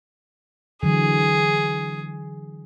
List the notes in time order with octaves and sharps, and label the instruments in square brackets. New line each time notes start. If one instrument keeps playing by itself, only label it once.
[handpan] D3 E3 F#3 [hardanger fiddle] G#4